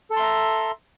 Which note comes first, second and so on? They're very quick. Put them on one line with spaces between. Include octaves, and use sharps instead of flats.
A4 A5 C6 E5 A#5